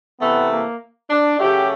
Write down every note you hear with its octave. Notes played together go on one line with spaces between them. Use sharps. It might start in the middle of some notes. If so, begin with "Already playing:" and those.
C3 E3 A3 B3
A#3
D4
C#3 F#3 A3 G4